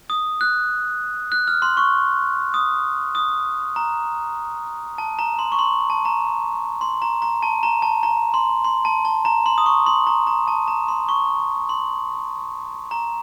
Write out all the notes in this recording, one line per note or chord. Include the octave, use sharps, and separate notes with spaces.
D#6
F#6
F#6
F6
C6
C#6
D#6
D#6
A#5
A5
A#5
C6
C#6
C6
A5
A#5
C6
A#5
A#5
A5
A#5
A5
A#5
C6
C6
A5
A5
A#5
C6
D#6
C#6
C6
A#5
A#5
A5
A#5
C6
C#6
C6
A#5